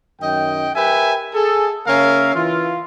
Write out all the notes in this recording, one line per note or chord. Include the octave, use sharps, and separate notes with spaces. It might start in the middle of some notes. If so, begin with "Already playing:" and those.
F#2 D#3 D#5 G5
G4 A#4 B4 E5 G5 G#5
G#4 A4
C#3 A#3 C#4 A#4 E5 F5
E3 F4